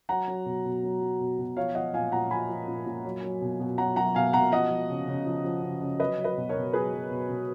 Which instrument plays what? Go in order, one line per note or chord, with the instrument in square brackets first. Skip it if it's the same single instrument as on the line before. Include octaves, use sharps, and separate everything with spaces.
[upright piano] F#3 F#5 A#5
F#3
B2
B2
F#3
F#3
B2
B2
F3 C#5 F5
F3 D#5 F#5
A#2 F5 G#5
A#2 F#5 A#5
F3 G#5 B5
F3
A#2
A#2
F#3
F#3
B2
B2
F#3 F#5 A#5
F#3 F#5 A#5
B2 F5 G#5
B2 F#5 A#5
F3 D#5 F#5
F3
C#3
C#3
F3
F3
C#3
C#3
F#3 B4 D#5
F#3
B4 D#5
B2
A#4 C#5
B2
F#3 G#4 B4
F#3
B2
B2